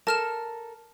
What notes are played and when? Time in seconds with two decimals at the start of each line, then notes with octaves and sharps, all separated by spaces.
0.07 A4 A#4 A5 F6 E7